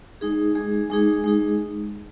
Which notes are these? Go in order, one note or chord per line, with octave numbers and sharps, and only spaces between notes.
G#3 D#4 G#4
G#3 D#4 G#4
G#3 D#4 G#4
G#3 D#4 G#4